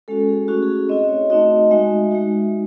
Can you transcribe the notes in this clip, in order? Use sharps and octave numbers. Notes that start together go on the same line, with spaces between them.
G#3 C#4 F#4 A4
G#4
A3 C#4 E4 F#4
G#4
G#4
C4 E4 D#5
C#5
A3 C4 D#4 F#4 D#5
G#3 D#4 F#4 E5
G#3 D#4 F#4